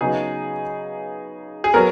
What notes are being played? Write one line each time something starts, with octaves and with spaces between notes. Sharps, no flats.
C#3 F#3 B3 D#4 G#4
G#4
F#3 B3 A#4